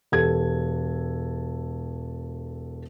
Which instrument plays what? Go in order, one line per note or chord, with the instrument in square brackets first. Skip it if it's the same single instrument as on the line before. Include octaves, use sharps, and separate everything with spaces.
[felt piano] E1 G4 A4 G#6